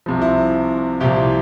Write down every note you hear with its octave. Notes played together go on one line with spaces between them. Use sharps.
C2 C3 F3
E4
C2 A#2 F3 E4 G4